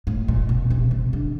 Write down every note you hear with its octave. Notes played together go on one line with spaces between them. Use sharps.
A2
A#2
B2
C3
C3
D3